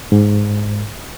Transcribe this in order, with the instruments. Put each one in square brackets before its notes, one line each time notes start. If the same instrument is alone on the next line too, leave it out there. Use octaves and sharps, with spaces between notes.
[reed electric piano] G#2